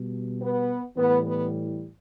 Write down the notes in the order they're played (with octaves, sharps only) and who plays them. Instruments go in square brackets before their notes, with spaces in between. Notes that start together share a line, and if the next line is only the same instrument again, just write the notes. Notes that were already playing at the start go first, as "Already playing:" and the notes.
Already playing: [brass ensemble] B2 G3
B3
A2 E3 G3 B3
B3